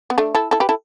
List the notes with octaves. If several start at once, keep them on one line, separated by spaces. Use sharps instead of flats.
B3
A3 D4
E4 A4
E4 A4
G4 B4
E4 A4